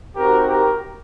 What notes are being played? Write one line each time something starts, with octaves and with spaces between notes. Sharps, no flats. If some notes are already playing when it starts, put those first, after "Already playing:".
C4 D#4 F#4 G4 A#4
G4 A#4